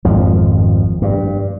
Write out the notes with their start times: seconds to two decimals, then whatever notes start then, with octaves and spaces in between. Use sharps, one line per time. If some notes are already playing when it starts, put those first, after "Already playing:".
0.05 G#1 F2 F3
1.02 G2